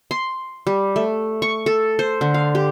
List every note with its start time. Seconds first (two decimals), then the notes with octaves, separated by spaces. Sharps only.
0.11 C6
0.67 G3
0.96 A3
1.42 C#6
1.66 A4
1.99 C5
2.21 D3
2.34 F5
2.55 G4